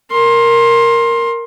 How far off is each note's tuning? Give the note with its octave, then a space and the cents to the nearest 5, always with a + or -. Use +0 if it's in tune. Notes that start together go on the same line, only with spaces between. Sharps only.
A#4 +0 C6 +20